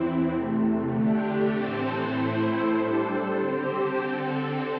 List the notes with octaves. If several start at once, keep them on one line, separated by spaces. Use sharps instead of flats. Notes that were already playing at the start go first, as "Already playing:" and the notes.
Already playing: E2 E3 C4 E4
E2 C3 A3
D3 A3 D4 G4
A2 E3 C4 A4 C5
A2 A3 E4 C5
G3 D4 A4 C5
D3 C4 G4 C5
D3 C4 A4